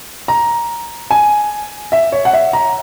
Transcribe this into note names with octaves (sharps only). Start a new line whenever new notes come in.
A#5
G#5
E5
C#5
F#5
E5
A#5